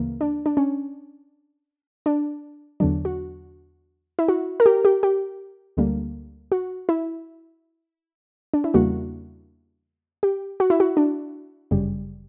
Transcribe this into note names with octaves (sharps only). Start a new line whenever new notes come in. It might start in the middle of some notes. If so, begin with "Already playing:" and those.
Already playing: D2 C#3 E3 A#3
D4
D4
C#4
D4
E2 D3 F#3 D4
F#4
E4
F#4
A#4
G4
G4
G4
D2 D3 G3 A#3
F#4
E4
D4
E4
E2 C#3 G3 A#3 F#4
G4
F#4
E4
F#4
D4
G1 F#2 C#3 G3